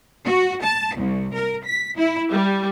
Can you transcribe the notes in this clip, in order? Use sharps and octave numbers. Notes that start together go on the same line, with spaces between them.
F#4
A5
C2
A#4
B6
E4
G3